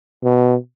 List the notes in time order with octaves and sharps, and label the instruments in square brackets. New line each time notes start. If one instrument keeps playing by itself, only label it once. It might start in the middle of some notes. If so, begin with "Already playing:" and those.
[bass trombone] B2